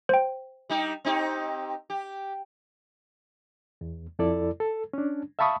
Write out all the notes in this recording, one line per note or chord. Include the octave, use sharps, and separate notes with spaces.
C5 G5
G3 D#4 G4
C4 D#4 G4
G4
E2
F2 E4 A4 D5
A4
C#4 D4
E5 F5 A5 B5 C#6 D#6